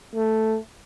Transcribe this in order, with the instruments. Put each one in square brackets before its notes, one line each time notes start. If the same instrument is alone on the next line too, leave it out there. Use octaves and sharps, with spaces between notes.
[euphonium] A3